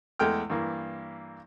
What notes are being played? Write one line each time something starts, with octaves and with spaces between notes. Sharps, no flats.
E2 G#3 A3 G5 F6
G2 E3 A#3